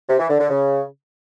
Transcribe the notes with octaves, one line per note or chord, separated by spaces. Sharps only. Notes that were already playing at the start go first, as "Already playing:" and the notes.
C3
E3
D3
D3
C#3